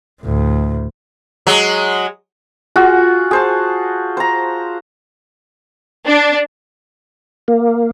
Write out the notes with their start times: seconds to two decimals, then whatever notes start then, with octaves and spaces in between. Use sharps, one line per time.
0.21 D2 A2
1.47 F#3 G#3
2.76 F4 F#4 G#4
3.31 G#4 C5 A5
4.17 C5 A#5
6.06 D4
7.48 A#3